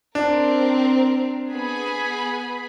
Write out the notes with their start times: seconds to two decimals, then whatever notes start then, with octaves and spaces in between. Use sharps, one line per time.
0.15 C4 D4 A#4
1.50 B3 G#4 B5